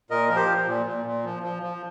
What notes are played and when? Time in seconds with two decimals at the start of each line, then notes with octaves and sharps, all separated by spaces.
0.10 A#2 A#4 D#5
0.29 F3 A#4
0.35 G4 C5
0.48 F3
0.67 A#2
0.86 A#2
1.06 A#2
1.24 F3
1.43 F3
1.63 F3